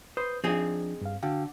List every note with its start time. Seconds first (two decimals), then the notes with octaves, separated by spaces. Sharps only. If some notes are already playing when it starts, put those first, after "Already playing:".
0.17 B4 C5 D#6 G6
0.44 F3 C4 D4 D#4 G#4
1.01 G2 F5
1.23 D3 F#4 F5 G5